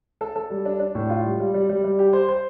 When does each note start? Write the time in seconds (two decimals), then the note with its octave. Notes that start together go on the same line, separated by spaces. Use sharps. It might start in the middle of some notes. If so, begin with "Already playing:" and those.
0.21 A4
0.36 A4
0.50 G3
0.65 D4
0.79 D4
0.95 A2
1.10 F4
1.24 G3
1.40 G3
1.54 G3
1.69 G3
1.84 G3
1.99 G4
2.13 C5
2.29 C5